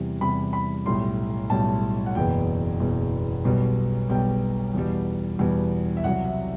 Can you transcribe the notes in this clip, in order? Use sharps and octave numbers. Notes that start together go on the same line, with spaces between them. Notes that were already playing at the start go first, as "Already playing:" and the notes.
Already playing: E2 C3 G3
E2 C3 G3 B5
B5
B1 A2 G3 C6
B1 A2 G3 A5
F#5
F#1 E2 B2 G5
F#1 E2 B2
B1 B2 G3
B1 B2 G3 G5
E2 B2 G3
E2 B2 G3
E5
C2 C3 F#3 F#5
E5